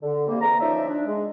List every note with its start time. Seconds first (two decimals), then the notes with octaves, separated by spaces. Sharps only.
0.03 D3
0.28 C3 G3 A#3
0.41 E2 A#5
0.60 F3 C#4 D#4 D5 E5
0.89 D4
1.06 G#3